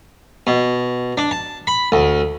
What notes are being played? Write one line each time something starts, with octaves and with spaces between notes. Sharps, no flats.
B2
D4
A5
B5
D2